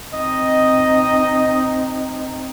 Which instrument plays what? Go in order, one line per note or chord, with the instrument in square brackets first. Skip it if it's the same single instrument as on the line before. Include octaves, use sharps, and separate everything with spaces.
[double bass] C4 D#4 [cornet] D#5